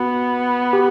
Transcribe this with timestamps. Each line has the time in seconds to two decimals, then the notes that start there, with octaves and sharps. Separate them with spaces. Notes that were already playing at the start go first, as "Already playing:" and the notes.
Already playing: B3 F#4
0.73 G4